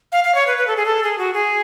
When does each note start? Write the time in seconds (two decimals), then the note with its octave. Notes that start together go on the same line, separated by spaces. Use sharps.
0.12 F5
0.24 F5
0.35 C#5
0.47 B4
0.57 B4
0.67 A4
0.76 G#4
0.86 A4
1.03 G#4
1.18 F#4
1.34 G#4